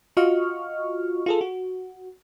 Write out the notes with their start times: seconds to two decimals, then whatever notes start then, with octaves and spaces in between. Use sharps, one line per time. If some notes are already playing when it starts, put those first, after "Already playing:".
0.17 F4 F#4 D#5 C#6 F6
1.26 F4 G#4 A4
1.41 F#4